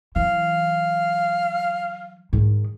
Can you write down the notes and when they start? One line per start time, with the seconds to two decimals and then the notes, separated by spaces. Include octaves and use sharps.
0.16 E3 F#3 F5
2.33 G#2 D#3